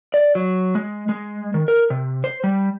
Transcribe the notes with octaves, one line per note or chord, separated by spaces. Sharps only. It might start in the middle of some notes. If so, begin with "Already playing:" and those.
D5
F#3
G#3
G#3
D#3
A#4
C3
C5
G3